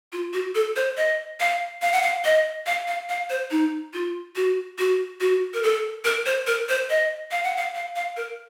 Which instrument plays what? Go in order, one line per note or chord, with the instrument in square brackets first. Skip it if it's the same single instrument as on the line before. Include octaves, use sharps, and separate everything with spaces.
[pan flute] F4
F#4
A4
C5
D#5
F5
F5
F#5
F5
D#5
F5
F5
F5
C5
D#4
F4
F#4
F#4
F#4
A#4
A4
A#4
C5
A#4
C5
D#5
F5
F#5
F5
F5
F5
A#4